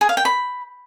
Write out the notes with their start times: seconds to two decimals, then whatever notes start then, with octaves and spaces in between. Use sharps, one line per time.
0.01 G#4
0.09 F5
0.17 G5
0.25 B5